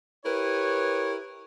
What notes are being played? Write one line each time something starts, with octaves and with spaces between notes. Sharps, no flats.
E4 G4 A#4 B4 C#5